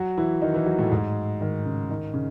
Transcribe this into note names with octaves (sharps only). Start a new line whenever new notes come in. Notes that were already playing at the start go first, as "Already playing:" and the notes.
Already playing: F#3 F#4
E3 E4
D#3 D#4
E3 E4
F#3 F#4
A2 A3
G#2 G#3
D#3
C#3
D#3
C#3